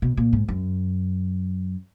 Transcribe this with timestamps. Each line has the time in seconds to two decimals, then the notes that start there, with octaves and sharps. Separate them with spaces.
0.02 B2
0.17 A#2
0.33 G#2
0.48 F#2